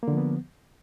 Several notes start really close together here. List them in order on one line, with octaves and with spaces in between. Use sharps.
A#3 D3 F3 B3